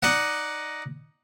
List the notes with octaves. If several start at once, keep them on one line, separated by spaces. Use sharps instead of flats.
D#4 D5 D#5 F#5